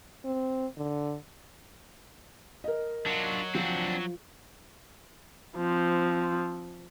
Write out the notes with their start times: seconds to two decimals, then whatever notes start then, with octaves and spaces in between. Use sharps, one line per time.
0.25 C4
0.77 D3
2.64 A#4 D#5
3.06 F#3 D4 F4 F#4
3.55 F3 C4 D4
5.56 F3 C4